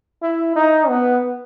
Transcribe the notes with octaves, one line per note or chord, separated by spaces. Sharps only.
E4
D#4
B3